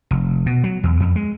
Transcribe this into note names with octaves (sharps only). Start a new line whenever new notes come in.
F1
B2
F#3
E2
F2
G#3